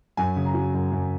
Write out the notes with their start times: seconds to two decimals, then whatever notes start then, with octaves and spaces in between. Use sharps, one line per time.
0.17 F#2 G#5
0.36 C#3
0.45 A#5
0.54 F#3
0.74 F#2
0.92 F#2